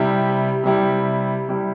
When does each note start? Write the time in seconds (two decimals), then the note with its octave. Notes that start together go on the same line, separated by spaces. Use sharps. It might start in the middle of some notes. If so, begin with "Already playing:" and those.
Already playing: C3 G3 E4 G4
0.63 C3 G3 E4 G4
1.48 C3 G3 E4 G4